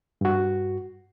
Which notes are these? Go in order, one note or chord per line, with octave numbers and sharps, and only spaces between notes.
G2 F#4